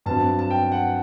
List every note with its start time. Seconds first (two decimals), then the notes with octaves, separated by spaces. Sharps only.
0.06 G2 F#3 C4 A5
0.39 A5
0.50 G5
0.72 F#5